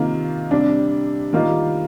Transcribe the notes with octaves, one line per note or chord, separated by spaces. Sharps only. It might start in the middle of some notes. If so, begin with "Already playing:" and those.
Already playing: C3 D#3 A#3 F4
C3 G3 D4
D#3 G3 A#3 F4